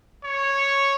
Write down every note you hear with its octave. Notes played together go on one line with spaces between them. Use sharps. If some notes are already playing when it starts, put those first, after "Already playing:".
C#5